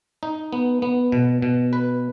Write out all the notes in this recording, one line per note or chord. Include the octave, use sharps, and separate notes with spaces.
D#4
B3
B3
B2
B2
B4